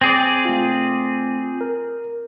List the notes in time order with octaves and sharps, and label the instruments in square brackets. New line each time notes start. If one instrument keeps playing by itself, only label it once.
[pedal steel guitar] C4 G#4 D5 [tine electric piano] G#6
[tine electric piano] A3 F4
A#4